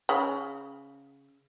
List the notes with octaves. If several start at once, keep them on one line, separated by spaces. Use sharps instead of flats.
C#3